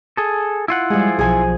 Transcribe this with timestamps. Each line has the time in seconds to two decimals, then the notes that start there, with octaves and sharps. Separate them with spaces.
0.17 G#4 A4
0.68 E4 F4 F#5
0.90 F3 G3 G#3 G#4
1.19 B1 F3 G#4 G#5